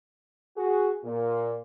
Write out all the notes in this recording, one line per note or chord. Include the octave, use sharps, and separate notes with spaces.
F#4 G#4
A#2